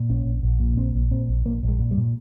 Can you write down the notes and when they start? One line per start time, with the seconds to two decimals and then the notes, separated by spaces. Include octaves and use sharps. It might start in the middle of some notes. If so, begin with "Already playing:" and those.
Already playing: A#2
0.09 A#1 C#4
0.25 A#1
0.43 A#1
0.60 A#2
0.77 A#1 C4
0.95 A#1
1.11 A#2 C4
1.28 A#1
1.46 A#1 A#3
1.63 A#1
1.69 G#3
1.79 A#2
1.91 G3
1.97 A#2